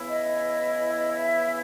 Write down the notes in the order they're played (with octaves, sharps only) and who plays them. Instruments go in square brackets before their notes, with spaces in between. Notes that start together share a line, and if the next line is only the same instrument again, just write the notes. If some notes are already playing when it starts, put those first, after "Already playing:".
Already playing: [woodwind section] C#3 E3 B3 E4
[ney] D#5
E5